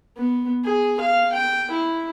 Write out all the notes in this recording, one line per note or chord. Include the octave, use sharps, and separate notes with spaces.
B3
G#4
F5
G5
E4